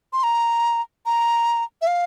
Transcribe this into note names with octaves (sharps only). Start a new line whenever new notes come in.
C6
A#5
A#5
E5
F5